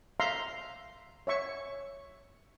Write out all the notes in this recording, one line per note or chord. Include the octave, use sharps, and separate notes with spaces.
E5 F5 A#5 C6
C#5 E5 C#6